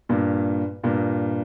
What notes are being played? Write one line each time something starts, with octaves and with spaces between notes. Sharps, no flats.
G2 A#2
G2 A#2